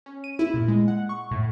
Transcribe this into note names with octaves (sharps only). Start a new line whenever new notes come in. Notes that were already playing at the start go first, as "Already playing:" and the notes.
C#4
D#7
E4
A#2
G#3
F#5
C#6
A2